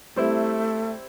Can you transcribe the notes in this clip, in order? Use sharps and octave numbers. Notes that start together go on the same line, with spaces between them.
G3 A3 C4 E4